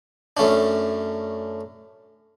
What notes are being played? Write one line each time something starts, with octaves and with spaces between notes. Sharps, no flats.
F#2 A3 C#4 D4